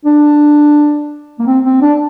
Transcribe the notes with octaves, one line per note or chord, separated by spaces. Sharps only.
D4
A#3
C4
C4
D4